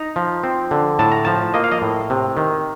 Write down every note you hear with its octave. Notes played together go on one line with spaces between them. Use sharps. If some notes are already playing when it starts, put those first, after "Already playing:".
Already playing: D#4 A#5
F3
C4
D3
A2 A5
A#5
F3 A5
A#3 D#5
F5
D#5
A2
C3
D#3